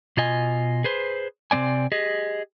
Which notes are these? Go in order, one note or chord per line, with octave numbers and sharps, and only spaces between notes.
B2 F4 D#5 G#5
G#4 B4 C5
C3 E3 C4 D5 G#5
G4 G#4 D#5